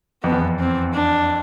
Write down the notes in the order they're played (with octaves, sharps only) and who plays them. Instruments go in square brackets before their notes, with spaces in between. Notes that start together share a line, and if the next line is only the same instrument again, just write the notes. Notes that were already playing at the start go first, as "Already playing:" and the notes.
[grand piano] F2 [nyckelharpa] B3
[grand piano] E2
F2
[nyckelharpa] C4
D4